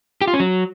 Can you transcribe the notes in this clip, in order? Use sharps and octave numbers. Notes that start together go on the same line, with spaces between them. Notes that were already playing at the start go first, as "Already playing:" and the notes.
G4
F4
C#4
F#3